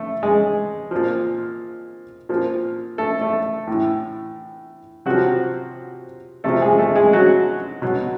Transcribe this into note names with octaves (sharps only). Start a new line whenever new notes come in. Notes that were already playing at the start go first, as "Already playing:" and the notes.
Already playing: A3 A4
G#3 G#4
A#2 F3
A#2 F3
A3 A4
A3 A4
A2 E3
C3 F3 F#3 F#4
C3 F3 A3 A4
G#3 G#4
A3 A4
G#3 G#4
F#3 F#4
B2 F#3